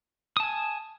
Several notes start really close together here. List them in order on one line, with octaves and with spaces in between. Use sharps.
D#6 A5 G#5